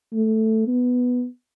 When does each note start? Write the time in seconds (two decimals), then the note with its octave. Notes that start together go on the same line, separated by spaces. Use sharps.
0.12 A3
0.67 B3